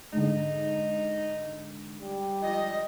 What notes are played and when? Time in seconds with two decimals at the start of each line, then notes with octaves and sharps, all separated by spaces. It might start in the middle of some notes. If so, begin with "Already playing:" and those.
0.13 G#2 D3 D#4
2.00 G3
2.42 F3 D#5